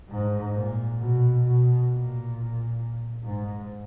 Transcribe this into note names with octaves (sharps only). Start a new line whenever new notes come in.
G#2
A#2
B2
B2
A#2
G#2